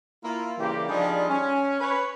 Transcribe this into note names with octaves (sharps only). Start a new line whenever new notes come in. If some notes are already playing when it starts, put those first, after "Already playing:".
A#3 E4 F4
C#3 E3 G3 A#3 G4
F3 G3 D4 D#4 F4 G#4
C#4
B4 C#5